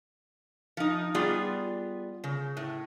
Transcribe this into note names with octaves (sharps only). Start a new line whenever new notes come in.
F3 D#4
G3 B3 F4 G#4 D5
C#3
A2